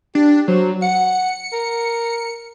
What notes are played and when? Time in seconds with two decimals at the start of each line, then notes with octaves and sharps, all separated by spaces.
0.15 D4 G4
0.48 F#3 C5
0.82 F#5 C#7
1.53 A#4